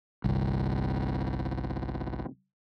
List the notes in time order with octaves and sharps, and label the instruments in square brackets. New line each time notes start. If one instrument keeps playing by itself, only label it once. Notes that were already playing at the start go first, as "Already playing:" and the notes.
[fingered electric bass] G1 C2